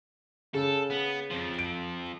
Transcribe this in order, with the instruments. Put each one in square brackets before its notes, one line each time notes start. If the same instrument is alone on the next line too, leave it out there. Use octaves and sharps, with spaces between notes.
[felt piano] C#3 [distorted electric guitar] A4
[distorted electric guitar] B3
F2 F3
[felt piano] D7